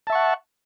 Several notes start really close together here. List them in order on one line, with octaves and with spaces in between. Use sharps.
A5 E5 C#6 F#5